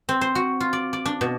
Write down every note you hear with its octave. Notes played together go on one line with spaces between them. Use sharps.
C4
C5
F#4
F4
D5
D5
D4
B2